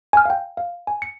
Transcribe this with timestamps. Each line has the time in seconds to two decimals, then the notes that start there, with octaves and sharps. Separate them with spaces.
0.13 G#5 F6
0.25 F5 G5
0.57 F5
0.87 G#5
1.02 C#7